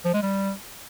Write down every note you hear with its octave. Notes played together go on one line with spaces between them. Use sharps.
F3
G#3
G3